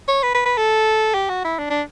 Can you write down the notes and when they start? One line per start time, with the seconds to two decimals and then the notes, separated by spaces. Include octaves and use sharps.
0.08 C#5
0.23 B4
0.34 B4
0.46 B4
0.57 A4
1.14 G4
1.29 F#4
1.45 E4
1.59 D4
1.70 D4